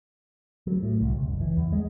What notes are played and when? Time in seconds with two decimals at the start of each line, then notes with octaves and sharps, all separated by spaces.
0.67 F#3
0.83 A2
1.01 C2
1.15 C#2
1.28 F#1
1.41 E3
1.57 E2
1.72 G#3